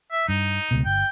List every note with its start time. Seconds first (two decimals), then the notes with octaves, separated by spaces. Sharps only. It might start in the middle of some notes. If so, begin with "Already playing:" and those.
0.12 E5
0.28 G2 D#4
0.71 C#2 B2
0.85 G1 G5